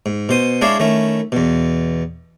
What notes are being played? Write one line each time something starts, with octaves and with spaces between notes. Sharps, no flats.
G#2
B2 C5 D#6
G#3 D4 E4 C#5 D5 F5
D#3 A3 C#4 E4
E2 B2